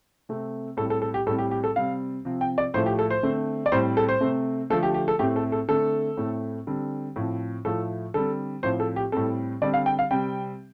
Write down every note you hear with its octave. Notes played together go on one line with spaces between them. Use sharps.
C3 A3 C4
A2 G3 C4 A4
A4
A4
G4
A2 G3 C4 A4
G4
G4
A4
C3 G3 C4 F5
C3 F3 C4
G5
D5
A2 F3 A3 C5
G4
A4
C5
D3 A3 C4
D5
A2 G3 C4 C5
A4
C5
C3 A3 C4
D3 F3 A3 A4
G4
G4
A4
A2 A3 C4 G4
A4
A4
D3 A3 C4 A4
A2 A3 C4
D3 G3 C4
A2 F3 C4
A2 F3 A3 A4
D3 G3 C4 A4
A2 F3 C4 C5
A4
G4
A2 G3 C4 A4
D3 G3 C4 D5
F5
G5
F5
C3 G3 C4 G5